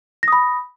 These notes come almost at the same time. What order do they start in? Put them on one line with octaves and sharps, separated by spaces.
A#6 D#6 B5